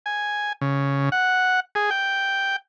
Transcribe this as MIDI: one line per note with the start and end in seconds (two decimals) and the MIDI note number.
0.06 0.53 80
0.61 1.09 49
1.12 1.60 78
1.75 1.90 68
1.90 2.56 79